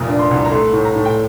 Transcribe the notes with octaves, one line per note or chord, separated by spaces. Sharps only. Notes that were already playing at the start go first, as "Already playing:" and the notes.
Already playing: F1 A#2 D#6
D4
C6
C2
A#5
A3 C6
A2
A#5
A2
G5